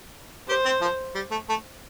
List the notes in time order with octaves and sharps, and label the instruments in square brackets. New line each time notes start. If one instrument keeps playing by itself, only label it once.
[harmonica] G4 [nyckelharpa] C5
[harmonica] C4
F3
G3
A3
A3